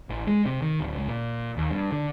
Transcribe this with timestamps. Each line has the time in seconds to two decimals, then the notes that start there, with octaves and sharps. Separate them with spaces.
0.09 A1
0.27 G#3
0.46 C3
0.62 D#3
0.80 D1
0.96 C#2
1.08 A#2
1.57 D#2
1.70 G2
1.92 D3